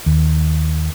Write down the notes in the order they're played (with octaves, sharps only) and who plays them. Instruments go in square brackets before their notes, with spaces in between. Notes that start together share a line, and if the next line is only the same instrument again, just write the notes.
[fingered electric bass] D#2